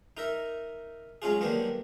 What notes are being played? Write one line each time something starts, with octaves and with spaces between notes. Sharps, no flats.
D#4 A#4 E5
F#3 G#3 C#4 F4 G#4
D3 D#3 F#3 G3 A#3 B3